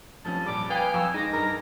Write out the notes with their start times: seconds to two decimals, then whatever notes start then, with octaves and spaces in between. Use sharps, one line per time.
0.25 F1 F3 C#4 A5
0.46 A#1 G3 D6
0.70 B4 F5 G5 G#5 D#6
0.94 F2 C#6 E6 E7
1.14 G#3 D#4 D6 A#6
1.33 G2 A#4